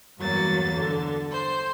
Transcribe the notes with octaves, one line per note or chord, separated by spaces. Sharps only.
E2 G2 F#3 A#3 A6
D3
C5